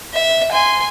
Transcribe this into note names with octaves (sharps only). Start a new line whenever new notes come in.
E5
G#5 C6